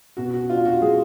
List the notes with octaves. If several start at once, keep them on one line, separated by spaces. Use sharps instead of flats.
B2 F#4
F#4
D4 F4
F#4
G#3 G#4